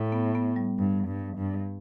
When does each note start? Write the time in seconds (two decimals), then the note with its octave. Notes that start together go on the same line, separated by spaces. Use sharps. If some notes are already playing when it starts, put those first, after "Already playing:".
Already playing: A2
0.12 B3
0.35 B3
0.56 G3
0.79 G2 G3
1.08 G2
1.37 G2